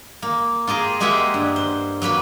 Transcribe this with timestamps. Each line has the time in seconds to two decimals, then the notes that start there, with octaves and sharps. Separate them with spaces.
0.22 A#3
0.67 F4 G4 G#4 A#4
1.00 G#3 A#3 G4 G#4 E5 F#5
1.34 G2
1.56 C5
2.02 F#3 A#3 B4 B5